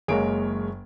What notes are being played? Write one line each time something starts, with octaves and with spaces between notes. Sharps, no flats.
F#1 G#3 A#3 G#4 C#5 D7